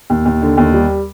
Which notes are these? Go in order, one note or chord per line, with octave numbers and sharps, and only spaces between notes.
D#2
D#2
D3
D#2
G3